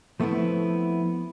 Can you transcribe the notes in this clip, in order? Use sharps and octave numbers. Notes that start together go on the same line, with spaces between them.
F3 A3 B3 C4 E4